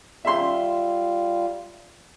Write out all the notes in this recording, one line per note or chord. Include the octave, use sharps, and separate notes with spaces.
G3 F4 E5 C6